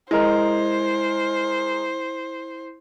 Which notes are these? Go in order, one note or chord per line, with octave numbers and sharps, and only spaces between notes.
G#3 E4 A#4 C5